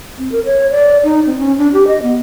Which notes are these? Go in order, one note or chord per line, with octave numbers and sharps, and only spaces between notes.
C4
A#4
C#5
D5
D#4
C4
C#4
D4
G4
D#5
B3